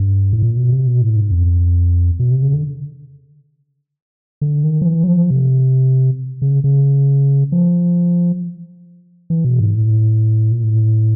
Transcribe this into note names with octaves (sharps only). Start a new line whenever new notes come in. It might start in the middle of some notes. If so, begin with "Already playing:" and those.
Already playing: G2
A2
A#2
B2
C3
B2
A2
G#2
F2
B2
C3
C#3
D3
D3
D#3
F3
E3
F#3
F3
C3
C#3
C#3
F3
E3
B2
G#2
A2
A#2
A2